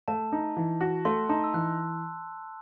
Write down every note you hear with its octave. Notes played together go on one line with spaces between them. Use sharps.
A3 A5
D#4
E3
F#4
A3 C6
D#4 A5
E6
E3 F#6